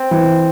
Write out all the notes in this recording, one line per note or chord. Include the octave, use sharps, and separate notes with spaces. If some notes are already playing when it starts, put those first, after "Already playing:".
Already playing: C4
E3